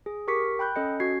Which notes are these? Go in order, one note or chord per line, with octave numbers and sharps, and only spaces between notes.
G#4
G4 A#4 C#6 D6 B6 C#7
G5 B5 F#6 G6
C#4 A4 D#5 C#7
C#4 F#4 G#6 C7